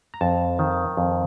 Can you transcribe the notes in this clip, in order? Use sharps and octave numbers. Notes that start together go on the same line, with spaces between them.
A#5
F2 A5
D#3
F2